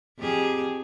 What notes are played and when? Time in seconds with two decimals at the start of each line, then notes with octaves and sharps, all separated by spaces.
0.19 F2 G4 G#4